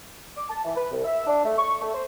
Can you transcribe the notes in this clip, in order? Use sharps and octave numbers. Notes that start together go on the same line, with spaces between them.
D6
A5
E3
B4
C2
E5
D4
A3
C#6
A3
C5